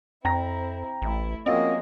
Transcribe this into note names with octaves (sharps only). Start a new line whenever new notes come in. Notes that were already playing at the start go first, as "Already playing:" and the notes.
F2 C4 E4 G5 A#5 A#6
A1 A3 E4
F3 G#3 A#3 C4 C#4 F4 F#4 D#5